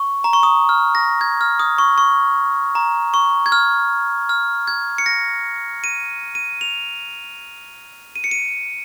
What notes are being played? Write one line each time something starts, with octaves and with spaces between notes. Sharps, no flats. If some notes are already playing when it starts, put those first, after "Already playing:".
Already playing: C#6
A#5
C#6
D#6
F6
A#6
G#6
F6
D#6
C#6
C#6
A#5
C#6
G#6
F6
F6
G#6
C#7
A#6
D#7
D#7
F7
D#7
C#7
D#7